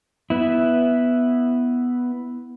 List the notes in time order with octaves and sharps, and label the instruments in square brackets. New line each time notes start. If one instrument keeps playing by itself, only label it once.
[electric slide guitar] B3 E4